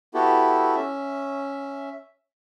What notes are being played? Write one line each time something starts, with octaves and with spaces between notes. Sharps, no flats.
B3 E4 F#4 G4 A4
C#4 E5